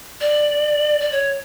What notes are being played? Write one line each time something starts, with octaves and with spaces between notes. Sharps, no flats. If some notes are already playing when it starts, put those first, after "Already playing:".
D5
D5
C#5